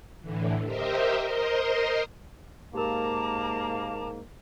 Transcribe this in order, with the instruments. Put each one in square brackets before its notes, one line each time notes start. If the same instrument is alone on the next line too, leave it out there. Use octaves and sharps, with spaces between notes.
[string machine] A2 D3 E3
G4 A#4 C5 D#5 E5
A#4 C5 D#5 C6
[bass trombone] G#2 [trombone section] A#3 [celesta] G4 A#4 [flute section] A5 A#5 D6